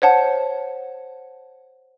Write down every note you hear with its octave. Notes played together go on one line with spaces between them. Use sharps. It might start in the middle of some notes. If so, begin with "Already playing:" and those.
C5 C#5 F#5 A5